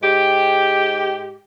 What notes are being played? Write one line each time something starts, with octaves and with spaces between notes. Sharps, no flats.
G#2 G#3 G4